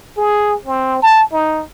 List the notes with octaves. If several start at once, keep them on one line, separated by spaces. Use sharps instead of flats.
G#4
C4
A5
D#4